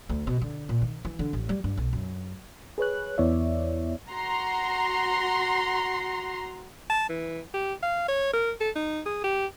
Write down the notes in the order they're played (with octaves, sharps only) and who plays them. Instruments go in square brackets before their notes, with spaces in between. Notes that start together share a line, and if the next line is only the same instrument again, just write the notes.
[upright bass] D2
B2
D3
A#2
D#3
E3
D3
A1
G3
G2
B1
F#2
[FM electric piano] G#4 B4 C#5 F#6
E2 B3 E4 C#5 D5 E5
[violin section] F#4 A#5 C6
[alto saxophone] A5
E3
G4
F5
C#5
A#4
A4
D#4
G#4
G4